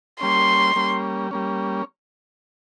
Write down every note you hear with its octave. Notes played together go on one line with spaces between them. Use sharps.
G3 A#3 C#4 C6
G3 A#3 C#4
G3 A#3 C#4